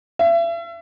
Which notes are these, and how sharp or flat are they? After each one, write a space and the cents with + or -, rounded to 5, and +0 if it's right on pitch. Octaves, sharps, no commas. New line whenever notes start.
E5 +40